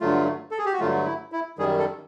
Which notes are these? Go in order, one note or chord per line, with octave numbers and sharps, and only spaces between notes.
G2 D3 F#3 A3 F4
A4
G#4
G4
F#4
G2 D3 F#3 A3 F4
E4
E4
F#2 D#3 G3 G#4
A4